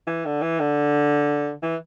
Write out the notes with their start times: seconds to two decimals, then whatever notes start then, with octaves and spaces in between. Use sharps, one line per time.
0.07 E3
0.25 D3
0.42 E3
0.59 D3
1.63 E3